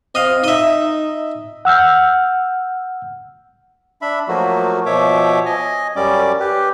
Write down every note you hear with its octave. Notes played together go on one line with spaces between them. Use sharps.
C4 D#5 F5
D#4 D#5 E5
F#5 E6 F6 G6
D4 E5 B5
F3 F#3 A3 A#3 F#4
B2 F3 C#5 E5 D6
D#5 G#5
F#2 G3 C#4 D5 D6
G4 B4